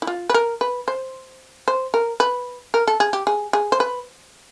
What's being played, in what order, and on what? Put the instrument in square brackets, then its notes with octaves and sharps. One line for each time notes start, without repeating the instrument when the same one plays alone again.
[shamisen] E4
F4
B4
A#4
B4
C5
C5
A#4
B4
A#4
A4
G#4
G4
G#4
G#4
C5
B4